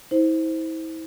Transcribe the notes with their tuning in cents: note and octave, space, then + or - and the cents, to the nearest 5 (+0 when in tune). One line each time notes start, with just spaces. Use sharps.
E4 -35 C5 +0